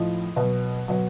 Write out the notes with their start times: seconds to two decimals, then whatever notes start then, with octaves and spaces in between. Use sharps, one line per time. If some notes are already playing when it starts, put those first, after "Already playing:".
Already playing: A2 F3 D#5
0.36 B2 F#3
0.88 B2 F#3